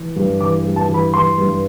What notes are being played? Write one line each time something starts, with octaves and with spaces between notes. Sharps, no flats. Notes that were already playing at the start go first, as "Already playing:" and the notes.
Already playing: E3
G2
E3 D6
G2
A5
E3
B5
E3 C6
G2